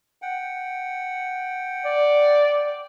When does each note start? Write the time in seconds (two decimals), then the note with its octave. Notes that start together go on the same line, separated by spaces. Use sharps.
0.22 F#5 G5
1.85 D5